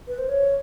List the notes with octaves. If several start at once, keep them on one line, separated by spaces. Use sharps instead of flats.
B4
C5
C#5